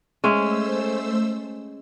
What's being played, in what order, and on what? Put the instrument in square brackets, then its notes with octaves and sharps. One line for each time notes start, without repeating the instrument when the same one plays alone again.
[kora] G#3 C#4 E5 [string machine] A3 C5 E6